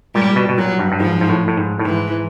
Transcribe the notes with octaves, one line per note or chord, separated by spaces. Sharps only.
A#2 G3
B2
B2
A#2 F#3
G2
G2
G#2 F3
G#2
A2
A2
G#2
A2
G#2 E3